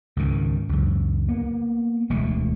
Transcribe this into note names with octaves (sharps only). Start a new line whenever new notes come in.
C#2 G#2 D#3
C#2 F#2
A#3 B3
E1 D2 G#3 A3